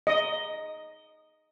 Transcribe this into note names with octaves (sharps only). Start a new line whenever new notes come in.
D#5